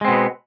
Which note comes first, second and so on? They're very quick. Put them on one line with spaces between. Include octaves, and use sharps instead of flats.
G#3 C4 B2 B3